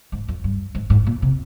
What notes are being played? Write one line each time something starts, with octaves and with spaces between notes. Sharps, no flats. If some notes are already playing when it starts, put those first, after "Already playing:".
G#2
F2
G2
G#2
G#2
A#2
C3